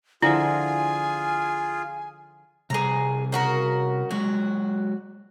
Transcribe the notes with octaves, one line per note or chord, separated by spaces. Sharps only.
D3 F3 E4 F4 G#4 E5 G#5
C3 G3 G#4 G#5 A#5
C#3 F#4 A#4
F#3 G#3 F#4